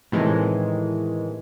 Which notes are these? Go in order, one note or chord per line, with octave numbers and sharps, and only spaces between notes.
A2 C3 D#3 E3 G#3